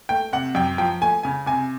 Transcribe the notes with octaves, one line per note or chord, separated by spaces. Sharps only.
A3 G5
C3 F#5
F#2 G5
F3 G5
A3 G#5
C#3 G#5
C3 G#5